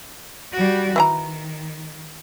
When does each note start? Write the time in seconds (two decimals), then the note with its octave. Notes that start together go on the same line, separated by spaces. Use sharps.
0.52 G3 F#4
0.96 D#3 E3 G#4 A#5